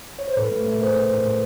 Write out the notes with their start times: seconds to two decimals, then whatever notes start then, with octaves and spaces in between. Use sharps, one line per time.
0.19 C#5
0.28 C5
0.37 A2 A4 B4
0.51 A3
0.66 A3
0.81 A2 A#4 C5
0.96 A3
1.11 A2
1.24 A2